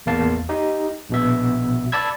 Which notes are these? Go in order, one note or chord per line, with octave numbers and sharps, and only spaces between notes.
A1 E2 A#3 F5 A5
D#4 G4
A#1 B2 E5
D5 A5 B5 E6 G#6